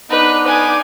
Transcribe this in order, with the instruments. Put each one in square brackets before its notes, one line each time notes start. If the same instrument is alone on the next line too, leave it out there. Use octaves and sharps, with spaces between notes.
[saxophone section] B3 D4 D#4 [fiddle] B4
[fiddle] G#5 D6